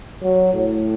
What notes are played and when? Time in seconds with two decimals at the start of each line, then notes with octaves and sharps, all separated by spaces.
0.23 F#3
0.54 A2